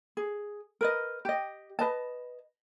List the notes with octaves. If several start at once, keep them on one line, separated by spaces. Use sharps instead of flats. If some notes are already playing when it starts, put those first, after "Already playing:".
G#4
A#4 B4 D#5
G4 D#5
B4 D#5 A5